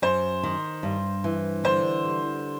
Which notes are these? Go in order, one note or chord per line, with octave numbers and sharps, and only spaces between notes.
F#2 C5
D#3
G2
E3
D3 C5
G3